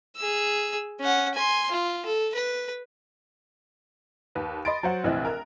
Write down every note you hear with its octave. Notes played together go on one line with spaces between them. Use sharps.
G#4 E6
C#4 F#5
G#5 C6
F4
A4
B4
D#2 B4
D#5 B5 C6 A6 D7
F#3 C5 F#5
F1 A#1 E3 C4 D#5 F#6
A#4